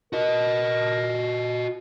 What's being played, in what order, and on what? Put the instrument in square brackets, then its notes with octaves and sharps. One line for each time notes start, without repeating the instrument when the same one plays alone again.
[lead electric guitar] F#4 D#5 [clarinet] A#4